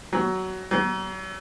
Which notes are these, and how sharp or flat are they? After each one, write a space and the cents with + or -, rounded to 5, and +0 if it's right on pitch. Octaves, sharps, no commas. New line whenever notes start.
F#3 +15
F#3 +40